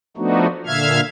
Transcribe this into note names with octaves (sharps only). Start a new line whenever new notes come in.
F3 A3 B3 D4 D#4 F#4
A#2 D3 E5 F5 F6 G#6